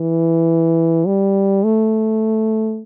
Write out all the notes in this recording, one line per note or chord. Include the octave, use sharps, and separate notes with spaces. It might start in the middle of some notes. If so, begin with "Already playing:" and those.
Already playing: E3
G3
A3